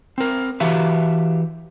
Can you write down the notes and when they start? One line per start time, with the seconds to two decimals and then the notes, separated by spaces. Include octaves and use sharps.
0.18 C4 A#4
0.60 E3 F#4 G4 E5 F5